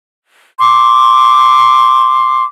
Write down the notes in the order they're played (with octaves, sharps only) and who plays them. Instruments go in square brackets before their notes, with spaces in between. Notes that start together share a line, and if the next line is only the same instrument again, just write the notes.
[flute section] C6 D6